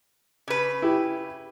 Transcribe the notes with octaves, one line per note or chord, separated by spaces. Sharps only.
C#3 B4
E4 G4